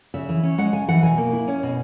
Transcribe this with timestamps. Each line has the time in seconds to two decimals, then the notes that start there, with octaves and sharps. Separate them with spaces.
0.14 C#3 E5
0.29 E3
0.43 C#4
0.58 G#3 F#5
0.73 C#3 G#5
0.88 E3 F#5
1.03 B2 G#5
1.18 A#3
1.33 E4
1.48 C#4
1.63 B2